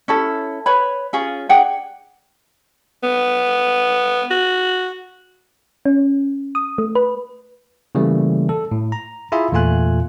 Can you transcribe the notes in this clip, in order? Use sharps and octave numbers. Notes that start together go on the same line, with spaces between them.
C#4 E4 A4
B4 C#5 B5
C#4 F4 G#4
D4 G#4 F#5 G5
B3
F#4
C#4
D#6
A3
B4
C#3 E3 G3 A3 A#3
A4
A2
A#5
E4 F4 G#4 E5
E2 A#2 A3 F4 G#5 F#6